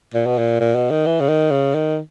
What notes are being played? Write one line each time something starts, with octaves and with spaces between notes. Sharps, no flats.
A#2
B2
A#2
A#2
B2
D#3
E3
C#3
D#3
C#3
D#3